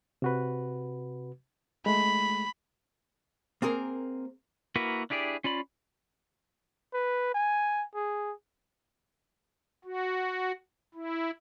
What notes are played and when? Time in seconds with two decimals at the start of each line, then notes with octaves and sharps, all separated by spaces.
0.22 C3 F#4 B4
1.86 G#3 A3 B5
3.62 A#3 C4 G#4 A#4
4.76 A#3 E4 F#4 A#4 B4
5.10 D4 E4 G4 G#4 D5
5.44 C#4 F4 D5 B5
6.94 B4
7.35 G#5
7.95 G#4
9.85 F#4
10.94 E4